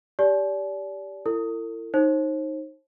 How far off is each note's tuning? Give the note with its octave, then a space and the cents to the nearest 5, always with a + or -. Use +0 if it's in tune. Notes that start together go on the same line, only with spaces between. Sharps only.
G4 +0 D5 -30 A5 -45
E4 +25 A4 +45
D#4 +0 C5 +40